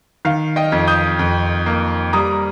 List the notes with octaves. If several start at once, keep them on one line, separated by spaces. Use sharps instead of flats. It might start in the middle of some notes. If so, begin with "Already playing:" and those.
D#3 F5
D#5 G5
F2
D#6 G6
F2
A#3
G3 A#5 D#6